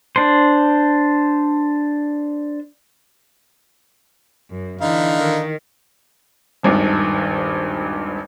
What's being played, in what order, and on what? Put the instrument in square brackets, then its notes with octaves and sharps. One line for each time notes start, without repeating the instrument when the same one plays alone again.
[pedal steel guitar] D4 C5
[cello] F#2
[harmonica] D3 D#4 F5 [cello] E3
[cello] D#3
[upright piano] D#1 G#1 G2 D#3